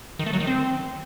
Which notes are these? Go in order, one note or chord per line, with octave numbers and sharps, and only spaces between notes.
D#3
A3
F#3
D#3
C4